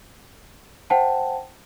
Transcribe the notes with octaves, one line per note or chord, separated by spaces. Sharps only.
C5 F#5 G5 A5